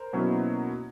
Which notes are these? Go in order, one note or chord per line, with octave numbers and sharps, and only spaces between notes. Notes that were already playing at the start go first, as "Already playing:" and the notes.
Already playing: A#4 C5
B2 F#3 A#3 C#4 E4